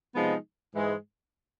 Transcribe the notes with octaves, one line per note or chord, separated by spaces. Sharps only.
C3 F3 G#3 B3 D#4
G#2 E3 G#3